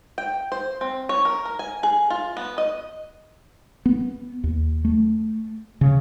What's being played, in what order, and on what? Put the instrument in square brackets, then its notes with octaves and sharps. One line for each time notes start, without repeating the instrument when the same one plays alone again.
[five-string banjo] G5
C5
C4
C#5
A#4
A#4
G#5
G#4
F4
B3
D#5
[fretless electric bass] B3
D#2
A3
C#3